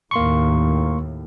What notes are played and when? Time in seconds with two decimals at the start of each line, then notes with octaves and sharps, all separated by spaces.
0.11 D#2 A2 A#3 C6 C#6